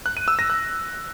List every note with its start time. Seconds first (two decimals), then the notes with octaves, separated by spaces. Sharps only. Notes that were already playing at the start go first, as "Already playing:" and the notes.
0.06 F#6
0.17 D#7
0.28 E6
0.39 A#6
0.50 F#6